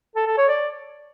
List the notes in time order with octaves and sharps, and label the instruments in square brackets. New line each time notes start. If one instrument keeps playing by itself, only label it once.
[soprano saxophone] A4
A4
C#5
D5